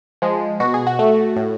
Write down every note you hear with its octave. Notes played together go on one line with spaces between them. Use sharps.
F3 G#3
B2 F#4
G#4
F#4
A3
A2